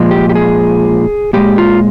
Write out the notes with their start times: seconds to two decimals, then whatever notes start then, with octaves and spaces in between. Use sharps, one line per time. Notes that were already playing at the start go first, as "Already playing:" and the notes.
Already playing: A#2 F3 G#3
0.11 G4
0.29 G4
0.35 G#4
1.33 A#2 G#3 G4
1.58 F4